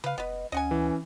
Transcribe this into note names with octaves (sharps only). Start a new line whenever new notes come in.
C#3 B4 F5
F1 B3 B4 D#5
D2 C#4 D#5 F#5 G#5
E3